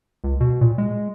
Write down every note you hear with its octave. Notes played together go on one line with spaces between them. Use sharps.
C#2
B2
A#2
G#3